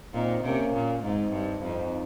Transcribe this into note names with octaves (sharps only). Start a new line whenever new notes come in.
A#2 C4 D#4
C3 A#3 C#4
A#2
G#2 C4 D#4
G2
F2 C4 D#4